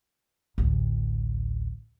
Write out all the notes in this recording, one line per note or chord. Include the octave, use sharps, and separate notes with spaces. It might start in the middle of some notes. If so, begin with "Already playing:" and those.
A1 D2